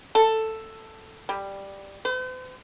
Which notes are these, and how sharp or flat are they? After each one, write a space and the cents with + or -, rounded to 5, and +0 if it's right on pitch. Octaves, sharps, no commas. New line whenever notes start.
A4 +5
G3 +5
C5 -45